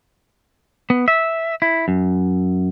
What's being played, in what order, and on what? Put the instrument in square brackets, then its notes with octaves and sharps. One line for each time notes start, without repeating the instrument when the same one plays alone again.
[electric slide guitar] B3
E5
E4
F#2